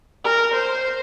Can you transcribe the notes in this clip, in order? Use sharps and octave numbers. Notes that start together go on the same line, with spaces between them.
A#4
C5